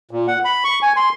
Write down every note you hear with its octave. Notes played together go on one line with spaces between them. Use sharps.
A#2
F#5
B5
C#6
G#5
C6